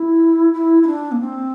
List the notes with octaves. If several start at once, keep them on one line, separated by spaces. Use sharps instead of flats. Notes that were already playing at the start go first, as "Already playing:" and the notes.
Already playing: E4
E4
E4
D4
A#3
C4